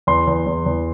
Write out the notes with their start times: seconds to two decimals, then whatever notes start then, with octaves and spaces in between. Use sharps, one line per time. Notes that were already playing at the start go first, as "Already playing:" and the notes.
0.07 E2 C6
0.27 E2
0.46 E2
0.66 E2